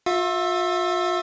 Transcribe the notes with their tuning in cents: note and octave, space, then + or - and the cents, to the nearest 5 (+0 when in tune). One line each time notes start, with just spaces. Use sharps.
F4 +40 E5 +0